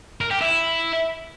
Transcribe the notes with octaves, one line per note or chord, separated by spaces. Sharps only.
A#4
G4
E4